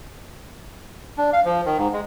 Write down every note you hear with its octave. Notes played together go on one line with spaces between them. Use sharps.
D4
F5
F3
D#3
G#2
G#3